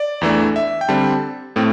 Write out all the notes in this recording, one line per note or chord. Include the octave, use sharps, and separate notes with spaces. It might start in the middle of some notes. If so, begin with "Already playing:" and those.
Already playing: D5
E2 E3 A3 D4
E5
G5
D3 G3 C4 A5
A2 A3 C4